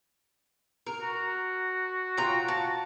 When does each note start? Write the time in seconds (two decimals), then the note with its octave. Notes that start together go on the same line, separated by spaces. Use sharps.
0.87 A#4
1.01 F#4
2.17 F4 G5 A#5
2.48 A5